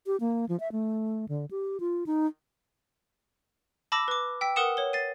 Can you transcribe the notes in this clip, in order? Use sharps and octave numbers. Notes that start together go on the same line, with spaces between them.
G4
A#3
F3
E5
A3
D3
G4
F4
D#4
A5 B5 D6 E6 A#6
B4 D6
G5 E6 B6
A#4 B4 F#5 D#6 C#7 E7
C#5 G7
A6 C7 D#7